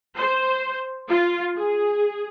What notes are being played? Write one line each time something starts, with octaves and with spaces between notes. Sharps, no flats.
C5
F4
G#4